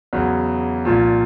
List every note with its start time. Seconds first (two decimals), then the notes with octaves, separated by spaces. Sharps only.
0.13 E2 C#3 F#3
0.85 C2 A#2 F3